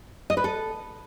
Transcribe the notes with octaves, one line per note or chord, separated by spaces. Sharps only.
D#5
B4
A4